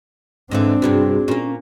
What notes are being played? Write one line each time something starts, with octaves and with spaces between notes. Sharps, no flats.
G#2 D3 E3 C4 D4
G2 C3 B3 F#4 G#4
A#2 A#3 C#4